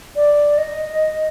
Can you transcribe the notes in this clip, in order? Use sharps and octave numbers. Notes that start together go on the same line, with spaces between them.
D5
D#5